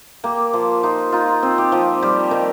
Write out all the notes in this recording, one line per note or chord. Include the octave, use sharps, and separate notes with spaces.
A#3 G4
F3 F4
D#4 F4
D#4 F4
C4
G4
F3
G3 G4
D#3